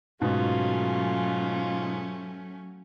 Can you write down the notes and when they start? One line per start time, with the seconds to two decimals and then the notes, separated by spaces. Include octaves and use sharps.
0.21 G#2 B2 F#3 A3 C#4 F4